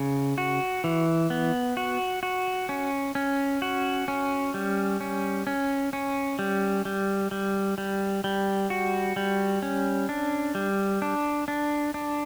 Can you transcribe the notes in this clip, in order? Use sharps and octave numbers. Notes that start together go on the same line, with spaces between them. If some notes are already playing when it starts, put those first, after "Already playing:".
Already playing: C#3
F#4
E3
B3
F#4
F#4
C#4
C#4
F#4
C#4
G3
C#4
C#4
C#4
G3
G3
G3
G3
G3
F#4
G3
C#4
D4
G3
D4
D4
D4